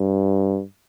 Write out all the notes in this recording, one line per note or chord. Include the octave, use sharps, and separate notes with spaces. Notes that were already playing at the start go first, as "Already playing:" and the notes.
Already playing: G2